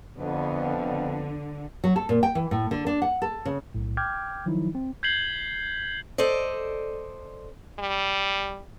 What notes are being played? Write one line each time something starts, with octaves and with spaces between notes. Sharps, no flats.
F2 D3 B3
F#3
A4
A#2
G5
E3
A2
D3
D4
F#5
A4
C#3
B1 A2
G5 D6 F6 G6 G#6
D#3 F3 F#3 D#4 E4
C4
G6 G#6 B6 C7 F#7 G7
A4 C5 D5 D#5
G3